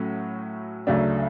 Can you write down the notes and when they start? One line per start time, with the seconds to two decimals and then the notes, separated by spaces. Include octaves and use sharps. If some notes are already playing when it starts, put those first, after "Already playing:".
Already playing: A2 F#3 A3 C#4 F#4
0.87 D2 C#3 F#3 A3 D4